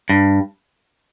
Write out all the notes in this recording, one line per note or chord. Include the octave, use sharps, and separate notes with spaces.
G2